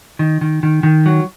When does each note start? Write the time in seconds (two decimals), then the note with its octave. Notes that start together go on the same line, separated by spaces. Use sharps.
0.19 D#3
0.41 D#3
0.63 D#3
0.83 D#3
1.06 F#3